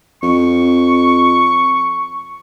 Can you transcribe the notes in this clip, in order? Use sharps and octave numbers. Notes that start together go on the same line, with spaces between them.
F2 C#6